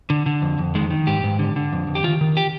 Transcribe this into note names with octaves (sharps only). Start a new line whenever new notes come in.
D3
D3
F2
F2
D#3 G#3
D#3
G#2 G4
G#2
D3
D3
F2
F2
G4
D#3 F4
D#3
G4